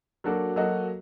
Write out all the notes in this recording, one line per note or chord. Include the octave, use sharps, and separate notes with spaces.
F#3 A#3 D4 F#4 A4
F#3 A#3 F#4 A4 D#5